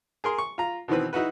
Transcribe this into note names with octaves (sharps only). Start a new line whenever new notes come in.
G#4 A#4 C6
C#6
F4 A#5
B2 D#3 E3 C4 B4
D#4 E4 F#4 B4